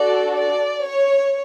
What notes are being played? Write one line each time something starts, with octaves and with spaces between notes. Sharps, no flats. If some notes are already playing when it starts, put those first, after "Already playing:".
Already playing: D4 F#4 A4 D5
D5
C#5